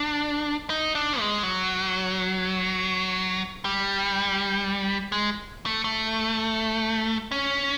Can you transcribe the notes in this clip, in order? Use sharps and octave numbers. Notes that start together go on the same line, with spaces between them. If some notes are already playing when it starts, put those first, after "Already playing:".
Already playing: D4
D#4
D4
G#3
F#3
G3
G#3
A3
A3
C#4